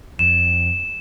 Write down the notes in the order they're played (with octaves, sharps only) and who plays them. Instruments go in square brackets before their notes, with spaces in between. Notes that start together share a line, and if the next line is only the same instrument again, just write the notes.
[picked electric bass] F2 [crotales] E7